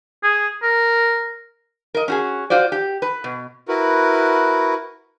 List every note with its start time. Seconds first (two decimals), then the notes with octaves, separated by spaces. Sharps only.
0.23 G#4
0.63 A#4
1.94 A#4 D#5
2.08 C#4 F#4 G#4
2.50 F4 F#4 C5 D5
2.72 G4
3.02 B4
3.24 B2
3.68 E4 F#4 A#4 B4